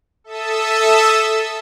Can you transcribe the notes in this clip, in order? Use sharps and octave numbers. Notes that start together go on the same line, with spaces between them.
A4 E5 A5 D#6 E6